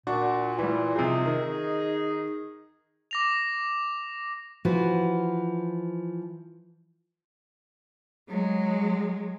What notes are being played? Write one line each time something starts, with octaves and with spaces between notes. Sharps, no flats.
A#2 D4 F#4 C#6
E3 G3
C3 F3 D#4 G#4
D#3
D6 A#6 F7
E3 F3 F#4 B4
F#3 G#3